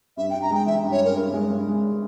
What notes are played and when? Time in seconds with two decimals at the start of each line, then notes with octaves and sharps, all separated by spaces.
0.17 G2 E5
0.30 G2 G5
0.42 A#5
0.51 G#3 G5
0.67 E3 E5
0.83 G2
0.92 C#5
1.00 G2 A#4
1.17 G2
1.33 G#3
1.50 G2
1.67 G#3